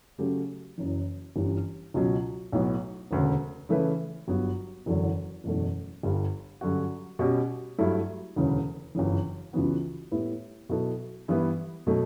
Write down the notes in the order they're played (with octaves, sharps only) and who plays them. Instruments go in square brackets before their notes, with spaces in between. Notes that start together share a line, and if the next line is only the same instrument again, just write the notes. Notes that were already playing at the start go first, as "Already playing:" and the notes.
[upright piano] C#3 F#3 A3 C#4 G4
F#1 F#2 E3
G1 G2 E3 G3 C#4
C#2 B2 F#3 C#4
B1 A2 F#3 B3
E1 D2 C#3
C#3 E3 A3 E4 B4
G1 G2 F#3 B3 F#4
F#1 E2 D3 F#3
F#1 E2 B2 F#3 A3
G1 G2 D3 G3
G2 D3 F#3 C#4 F#4
B2 G3 C#4 G4
G2 F#3 A3 E4
E1 D2 C#3 E3
G1 F#2 C#3 E3
C#2 C#3 E3 B3 F#4
A2 G3 B3 E4 B4
B2 F#3 B3 E4 A4
G2 E3 B3 E4 B4
B2 F#3 A3